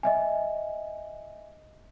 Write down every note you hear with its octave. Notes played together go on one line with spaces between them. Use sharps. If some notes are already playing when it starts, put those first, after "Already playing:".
D#5 E5 G#5